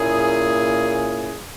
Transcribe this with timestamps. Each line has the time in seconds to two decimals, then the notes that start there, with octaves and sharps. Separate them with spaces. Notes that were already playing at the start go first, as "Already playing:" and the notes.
Already playing: A#2 A#3 C#4 E4 G#4